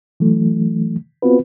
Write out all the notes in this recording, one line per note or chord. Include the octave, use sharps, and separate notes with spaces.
E3 F#3 A3
B3 C4 F4 F#4 B4